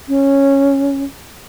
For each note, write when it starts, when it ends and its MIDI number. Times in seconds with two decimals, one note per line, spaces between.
0.08 1.04 61